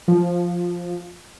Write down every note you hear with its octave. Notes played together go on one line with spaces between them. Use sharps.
F3